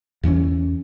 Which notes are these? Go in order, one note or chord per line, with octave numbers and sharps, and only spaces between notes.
E2 E3 C4 C#4